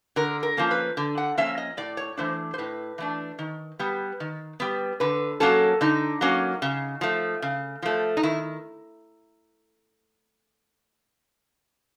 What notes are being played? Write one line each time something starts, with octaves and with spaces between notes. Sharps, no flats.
D3 A#4
A#4
F3 A#3 C#4
B4
D3
F#5
F3 A#3 C#4 E5
D#5
A2 D5
C#5
E3 A3 D4 C5
C5
A2 B4
E3 A3 D4
D#3
G3 B3
D#3
G3 B3
D3 B4
F#3 A#3 C#4 A4
D3 D#4
F#3 A#3 C#4
C#3
F3 A3
C#3
F3 A3
D#4
D#3 E4